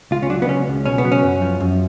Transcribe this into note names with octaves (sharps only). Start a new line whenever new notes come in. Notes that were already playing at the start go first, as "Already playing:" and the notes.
C#2 F4
C#4
F#3 D4
B3
C#2 C#4
C#2
B2 C#4
B3
F#3
C#4
F#2
F3
F#2